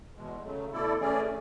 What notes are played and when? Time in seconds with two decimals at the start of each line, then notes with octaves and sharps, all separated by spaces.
0.15 E2 B2 G#3
0.43 C#3 F#3 A3
0.70 B2 A3 E4 A4 D5
0.98 E3 A3 C#4 G#4 D5